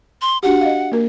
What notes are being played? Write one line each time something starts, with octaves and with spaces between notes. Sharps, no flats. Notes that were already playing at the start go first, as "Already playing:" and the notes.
C6
D4 F#4 G4 F#5
D#5 F5
A#3 A#4